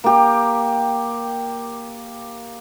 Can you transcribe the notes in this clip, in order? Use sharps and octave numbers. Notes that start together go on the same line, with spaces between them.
A#3 G4